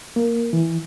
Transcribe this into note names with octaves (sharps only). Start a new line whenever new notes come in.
A#3
E3